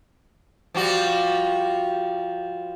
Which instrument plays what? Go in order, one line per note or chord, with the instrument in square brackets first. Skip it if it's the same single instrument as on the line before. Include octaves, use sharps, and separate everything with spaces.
[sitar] F3 G3 F#4